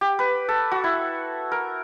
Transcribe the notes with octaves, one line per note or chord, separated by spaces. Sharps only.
G4
B4
A4
F#4
E4
A#4